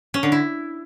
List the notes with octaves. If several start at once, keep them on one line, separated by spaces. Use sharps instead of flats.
C#4
D3
E4